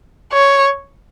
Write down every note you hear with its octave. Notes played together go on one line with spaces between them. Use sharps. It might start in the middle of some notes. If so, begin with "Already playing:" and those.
C#5